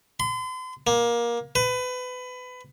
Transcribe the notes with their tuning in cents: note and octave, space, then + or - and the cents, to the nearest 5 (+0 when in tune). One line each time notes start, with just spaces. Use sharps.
C6 -40
A#3 +20
B4 +25